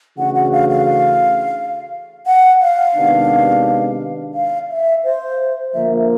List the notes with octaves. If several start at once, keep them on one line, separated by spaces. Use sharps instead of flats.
C#3 E3 A3 D4 F#4 F#5
F#5
F5
F5
F#5
F5
C3 D#3 G#3 B3 D4
F5
E5
C5
D3 F3 A#3 E5